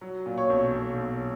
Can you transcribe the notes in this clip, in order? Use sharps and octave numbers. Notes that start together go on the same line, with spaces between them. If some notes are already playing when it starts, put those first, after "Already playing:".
F#3
A#2
C#5
B1
B1
B1